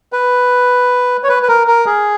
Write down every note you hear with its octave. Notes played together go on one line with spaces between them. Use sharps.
B4
C#5
B4
B4
A#4
A#4
G#4